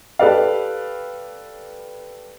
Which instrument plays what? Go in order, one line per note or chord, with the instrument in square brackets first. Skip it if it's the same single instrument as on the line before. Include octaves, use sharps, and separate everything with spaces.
[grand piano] G4 A4 B4 D5 F5